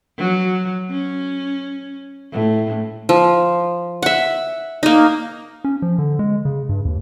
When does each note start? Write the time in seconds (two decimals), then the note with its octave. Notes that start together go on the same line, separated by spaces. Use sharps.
0.19 F#3
0.91 C#4
2.32 A2
3.09 F3
4.02 E5 F#5
4.83 A#3 D#4
5.64 C#4
5.82 F3
5.98 D3
6.19 G#3
6.45 C#3
6.69 G2
6.85 D#2